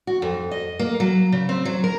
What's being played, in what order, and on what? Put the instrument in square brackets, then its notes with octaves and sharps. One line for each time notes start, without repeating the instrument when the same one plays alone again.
[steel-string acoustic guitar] F#4
F2
D#5
A#3
F#3
C#3
C4
F#3
A#4